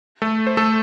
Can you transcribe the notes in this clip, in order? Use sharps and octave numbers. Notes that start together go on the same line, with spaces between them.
A3 A4
C5
A3 A4